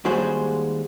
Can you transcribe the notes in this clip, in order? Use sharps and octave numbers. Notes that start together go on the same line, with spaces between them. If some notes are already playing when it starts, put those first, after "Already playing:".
D#2 G3 G#3 F#4 G#4 C5